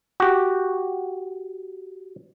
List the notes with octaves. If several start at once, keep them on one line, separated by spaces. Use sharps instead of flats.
F#4 G4